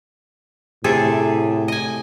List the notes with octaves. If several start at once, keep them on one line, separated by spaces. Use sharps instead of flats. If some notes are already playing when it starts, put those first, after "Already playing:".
A2 C3 G#4 A4
D#5 G#5